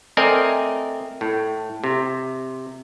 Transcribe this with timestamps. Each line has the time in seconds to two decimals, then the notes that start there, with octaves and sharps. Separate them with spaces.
0.17 A3 C4 A#4 D5 D#5 G#5
1.21 A2
1.84 C3